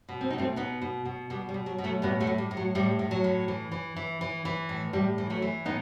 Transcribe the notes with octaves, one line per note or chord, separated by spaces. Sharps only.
B2
C4
B2 D#4
A3 C4
B2 B3 D#4
B2
B2
B2 G3 B3
G3
B2
F#3
B2
F#3 A3
A2 G3 B3
F#3 A3
A2
G3
A2
F#3
A2 G3
A2
F#3
A2
E3
E3
E3
E3
E3
A2
A2 G3
E3
F#3 A3
E3
A2 B3 D#4